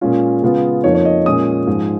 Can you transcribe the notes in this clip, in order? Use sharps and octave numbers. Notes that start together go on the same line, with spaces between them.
A#2 G#3 C#4 F4
C#3 G#3 B3 F4
F2 F3 A#3 D#4 C#5
C#5
D#5
A#2 G#3 C#4 D#6
G#2 F3 G#3